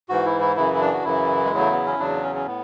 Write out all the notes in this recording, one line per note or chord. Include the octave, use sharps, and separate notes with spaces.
G#2 E3 F#4
E4
E4
F#2 C#3 E3 E4
E4
D4
F#4
F#2 C#3 E3 E4
G#3
E2 C#3 F#3
A3
B3
C#4
E2 C#3 F#3 D4
C#4
C#4
A2 B3